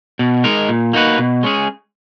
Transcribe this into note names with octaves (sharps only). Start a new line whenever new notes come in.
B2
G#3 D#4 A#4
A#2
A#3 D#4 F#4 B4
B2
G#3 C#4 G#4